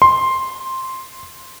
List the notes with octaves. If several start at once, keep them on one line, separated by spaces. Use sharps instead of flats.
C6